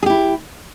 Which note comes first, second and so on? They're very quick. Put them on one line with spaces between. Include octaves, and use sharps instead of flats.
G#4 G4 E4